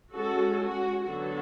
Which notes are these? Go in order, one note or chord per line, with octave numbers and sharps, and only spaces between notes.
G#3 C#4 F#4 A4
F#4
D3 F#3 B3 F#4 A4